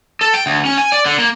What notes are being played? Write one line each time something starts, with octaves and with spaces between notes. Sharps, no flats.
A4
G5
D2
C#4
G#5
D5
D3
A#3